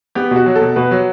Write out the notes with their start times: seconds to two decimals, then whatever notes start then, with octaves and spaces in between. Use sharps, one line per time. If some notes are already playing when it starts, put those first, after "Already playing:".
0.15 B3 G4
0.31 B2 F#4
0.46 F#3
0.56 A4
0.61 B2
0.76 B2 B4
0.91 F#3